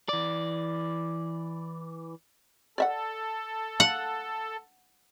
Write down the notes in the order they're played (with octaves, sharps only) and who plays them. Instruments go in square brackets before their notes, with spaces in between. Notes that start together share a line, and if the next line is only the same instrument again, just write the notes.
[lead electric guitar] E3 D5
[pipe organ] A4 [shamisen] D5 E5 F#5
[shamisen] F5 [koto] F#5